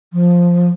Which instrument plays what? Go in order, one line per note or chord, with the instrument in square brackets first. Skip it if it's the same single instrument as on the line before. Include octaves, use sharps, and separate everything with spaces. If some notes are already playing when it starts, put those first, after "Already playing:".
[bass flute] F3